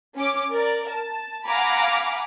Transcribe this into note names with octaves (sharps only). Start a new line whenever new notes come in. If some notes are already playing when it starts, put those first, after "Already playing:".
C#4 D6
A#4 D5
A5
F5 F#5 G#5 A#5 B5 D6